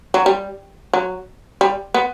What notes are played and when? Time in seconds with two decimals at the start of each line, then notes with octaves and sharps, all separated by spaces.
0.14 F#3
0.26 G3
0.93 F#3
1.61 G3
1.94 B3